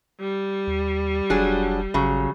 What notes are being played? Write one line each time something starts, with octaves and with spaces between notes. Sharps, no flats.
G3
D#2
F1 F#3 D4 G#4
G#1 C#3 F#3